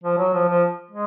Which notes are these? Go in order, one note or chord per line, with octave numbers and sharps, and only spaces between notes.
F3
F#3
F3
F3
G#3